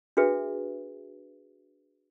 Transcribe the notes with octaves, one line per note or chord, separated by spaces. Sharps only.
D4 F#4 G#4 B4 E5